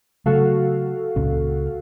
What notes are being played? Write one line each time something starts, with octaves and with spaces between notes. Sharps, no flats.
C#3 F#3 A3 F#4 A4 F5
C#2 A#2 C#4